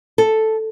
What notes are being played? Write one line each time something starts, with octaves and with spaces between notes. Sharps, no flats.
A4